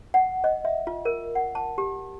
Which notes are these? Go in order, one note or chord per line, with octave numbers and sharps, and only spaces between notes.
F#5
D#5
E5
F4
A#4
F#5
A5
G4